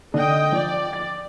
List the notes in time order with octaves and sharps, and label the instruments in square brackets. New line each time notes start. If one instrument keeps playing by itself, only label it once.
[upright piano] D3 D4 [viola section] D#5 G5
[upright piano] F3 [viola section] D5
[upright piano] A6